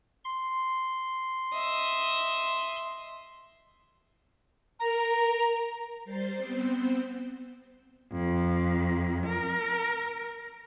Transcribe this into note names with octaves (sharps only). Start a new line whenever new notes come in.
C6
D#5 E5
A#4 A#5
G3 C5 C6 A6 C7
B3 C4 C5
F2
A#4